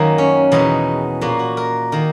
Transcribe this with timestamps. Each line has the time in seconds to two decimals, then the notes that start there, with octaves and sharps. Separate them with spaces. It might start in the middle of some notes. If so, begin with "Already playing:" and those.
Already playing: F#2 D#3 F#3 A#3
0.18 C#4
0.52 E2 B2 G#3 B3 D#4
1.21 A#2 A#3 F#4
1.39 F#4
1.57 A#4
1.92 D#3 A#3